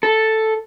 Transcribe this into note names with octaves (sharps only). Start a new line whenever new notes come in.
A4